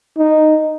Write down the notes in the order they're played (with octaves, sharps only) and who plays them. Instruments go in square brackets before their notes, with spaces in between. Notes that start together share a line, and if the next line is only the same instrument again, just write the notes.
[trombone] D#4